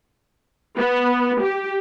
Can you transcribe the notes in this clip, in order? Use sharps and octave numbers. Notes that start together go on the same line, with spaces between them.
B3
G4